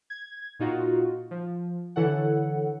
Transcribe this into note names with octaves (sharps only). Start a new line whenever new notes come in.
G#6
A#2 D#4 F4 F#4
F3
D3 E3 E4 A4 C#5 F#5